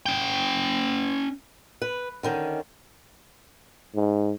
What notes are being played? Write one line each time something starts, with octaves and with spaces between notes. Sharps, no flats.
C#4 G5
B4
D3 D#3 C#4
G#2